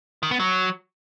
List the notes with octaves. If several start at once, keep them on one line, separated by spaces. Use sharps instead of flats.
D#3
B3
F#3